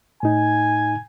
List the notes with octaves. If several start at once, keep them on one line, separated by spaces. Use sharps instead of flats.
A2 D#4 G#5